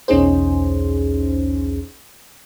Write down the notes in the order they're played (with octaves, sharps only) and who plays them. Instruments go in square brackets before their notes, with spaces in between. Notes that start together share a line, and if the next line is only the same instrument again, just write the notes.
[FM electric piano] B1 E2 C#4 D#4 G#4 C5